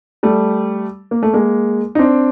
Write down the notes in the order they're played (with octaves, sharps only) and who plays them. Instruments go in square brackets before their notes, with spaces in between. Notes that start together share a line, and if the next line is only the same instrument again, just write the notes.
[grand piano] G3 A3
A#3
A3
G#3 A#3
D#4
C4 D4